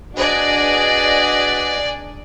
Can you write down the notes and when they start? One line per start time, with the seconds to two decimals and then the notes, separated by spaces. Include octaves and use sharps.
0.15 D4 F#4 G#4 B4 D5 D#5